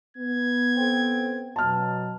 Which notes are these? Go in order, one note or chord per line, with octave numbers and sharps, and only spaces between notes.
B3 G#6
C4 A4 G5
B2 F#3 A5 F6